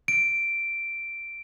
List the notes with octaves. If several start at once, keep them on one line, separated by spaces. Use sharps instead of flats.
D7